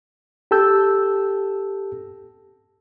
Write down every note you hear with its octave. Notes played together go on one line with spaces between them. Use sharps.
G4 A4 A5 E6 G6